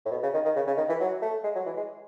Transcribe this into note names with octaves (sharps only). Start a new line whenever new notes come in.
A2
B2
C#3
D#3
D#3
C#3
C#3
D#3
E3
F#3
A3
G#3
F#3
E3
G#3